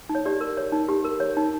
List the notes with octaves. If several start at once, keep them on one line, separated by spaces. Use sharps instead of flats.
D#4
C#5
G4 D5
A#4
C#5
D#4
G4
A#4
C#5
D#4